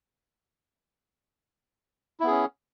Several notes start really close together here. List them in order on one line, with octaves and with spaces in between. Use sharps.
E4 B3 G#4 C#4